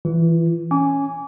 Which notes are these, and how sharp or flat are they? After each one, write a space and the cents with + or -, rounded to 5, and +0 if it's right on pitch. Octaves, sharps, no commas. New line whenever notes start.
E3 +0 F4 -40
C#4 +0 G#5 +0 D6 -35